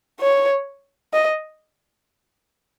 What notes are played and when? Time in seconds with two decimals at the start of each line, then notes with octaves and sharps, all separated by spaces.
0.21 C#5
1.13 D#5